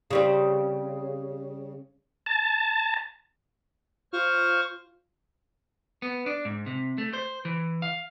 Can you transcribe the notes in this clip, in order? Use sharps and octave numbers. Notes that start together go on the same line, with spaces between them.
C#3 G3 C4
A5
F4 C5 C#6 F6
B3
D4
G#2
C3
A3
C5
E3
F5